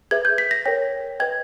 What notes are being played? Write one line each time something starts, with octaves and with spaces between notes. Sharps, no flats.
G#4 B4 E5 G#6
G6
B6
A#6
A#4 C#5 G5 A#6
B4 D#5 G5 G#6